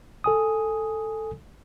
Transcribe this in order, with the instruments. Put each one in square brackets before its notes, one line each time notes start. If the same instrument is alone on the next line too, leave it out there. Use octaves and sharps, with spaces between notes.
[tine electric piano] A4 G#5 D#6